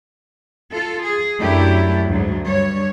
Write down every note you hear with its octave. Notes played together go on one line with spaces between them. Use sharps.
F4 A4
G#4
F#2 F#3 A3 D4 E4 G4
D2 G#2 F#3
G2 C#5